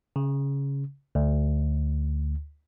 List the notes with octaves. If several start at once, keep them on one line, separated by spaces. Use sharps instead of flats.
C#3
D2